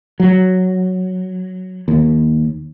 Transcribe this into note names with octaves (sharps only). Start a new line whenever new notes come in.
F#3
D#2